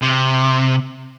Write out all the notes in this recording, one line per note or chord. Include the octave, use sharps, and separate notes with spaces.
C3